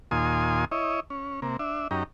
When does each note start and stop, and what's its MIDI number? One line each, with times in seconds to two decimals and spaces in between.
0.11 0.65 39
0.11 0.65 46
0.11 0.65 65
0.11 0.65 80
0.11 0.65 84
0.11 0.65 87
0.72 1.00 64
0.72 1.00 73
0.72 1.00 75
1.10 1.40 61
1.42 1.57 48
1.42 1.57 58
1.59 1.88 62
1.59 1.88 76
1.91 2.03 42
1.91 2.03 61
1.91 2.03 63
1.91 2.03 67
1.91 2.03 82